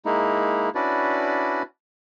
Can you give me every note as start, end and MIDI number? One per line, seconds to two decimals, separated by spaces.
0.06 0.69 56
0.06 0.69 58
0.06 0.69 63
0.06 0.69 64
0.75 1.62 61
0.75 1.62 62
0.75 1.62 64
0.75 1.62 66
0.75 1.62 71
0.75 1.62 74